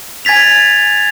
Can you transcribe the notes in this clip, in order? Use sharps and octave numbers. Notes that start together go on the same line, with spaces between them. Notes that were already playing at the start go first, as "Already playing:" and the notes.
G#5 G#6 A6 B6 F7